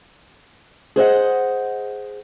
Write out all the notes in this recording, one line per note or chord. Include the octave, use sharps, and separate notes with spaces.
G#4 C5 D#5 F#5